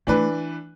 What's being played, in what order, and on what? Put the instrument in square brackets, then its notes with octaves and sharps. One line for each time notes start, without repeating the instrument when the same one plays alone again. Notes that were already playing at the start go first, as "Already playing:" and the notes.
[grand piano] E3 D4 B4 [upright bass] A3